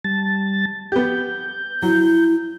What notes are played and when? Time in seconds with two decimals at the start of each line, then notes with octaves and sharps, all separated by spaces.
0.04 G3 A5 A6
0.92 B3 G4 G6
1.82 F#3 E4